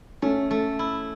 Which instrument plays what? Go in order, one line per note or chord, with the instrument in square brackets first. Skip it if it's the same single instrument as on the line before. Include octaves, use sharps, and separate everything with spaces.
[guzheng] A3 [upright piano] C#4
[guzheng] A3
E4